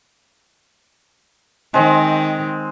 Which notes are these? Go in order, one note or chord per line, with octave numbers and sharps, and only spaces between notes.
D#3 G#3 C4